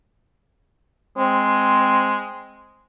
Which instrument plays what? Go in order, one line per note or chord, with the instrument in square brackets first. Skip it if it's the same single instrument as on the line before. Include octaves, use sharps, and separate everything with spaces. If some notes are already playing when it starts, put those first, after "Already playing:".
[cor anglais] G#3 [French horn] C4